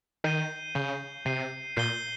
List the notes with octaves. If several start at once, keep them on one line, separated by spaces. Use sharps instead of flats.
D#3 G6 C7 D#7 G7
C#3 G6 C7 D#7 G7
C3 G6 C7 D#7 G7
A#2 G6 C7 D#7 G7